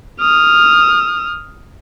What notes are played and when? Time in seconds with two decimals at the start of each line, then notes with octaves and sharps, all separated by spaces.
0.20 D#6 F6